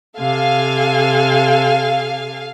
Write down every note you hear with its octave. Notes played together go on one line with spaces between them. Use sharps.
C3 A4 F5 G#5